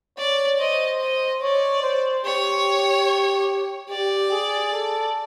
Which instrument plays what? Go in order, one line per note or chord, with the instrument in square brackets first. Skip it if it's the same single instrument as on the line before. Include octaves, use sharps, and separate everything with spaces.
[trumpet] C#5 [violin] D5
[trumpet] C5 [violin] D#5
[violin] D#5
[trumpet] C#5 [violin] D5
[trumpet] C5
[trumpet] G4 [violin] C#5
[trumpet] G4 [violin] D5
[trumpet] G#4
A4